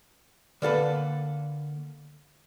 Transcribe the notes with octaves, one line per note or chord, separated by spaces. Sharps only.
D3 A#3 A4 B4